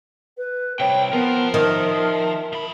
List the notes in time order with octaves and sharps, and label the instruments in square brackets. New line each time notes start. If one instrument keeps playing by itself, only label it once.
[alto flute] B4
[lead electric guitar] C3 G3 [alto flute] C#5 [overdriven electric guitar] G5
[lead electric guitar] F3 [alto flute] B3 [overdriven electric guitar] A#4
[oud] D#3 [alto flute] E5
[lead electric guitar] F3 B5